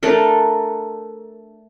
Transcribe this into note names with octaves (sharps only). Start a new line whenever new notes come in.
A3 D4 A4 A#4